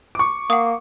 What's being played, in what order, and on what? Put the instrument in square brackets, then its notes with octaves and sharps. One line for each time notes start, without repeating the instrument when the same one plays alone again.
[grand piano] C#6 D6
[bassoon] A#3 [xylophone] F#5 D#6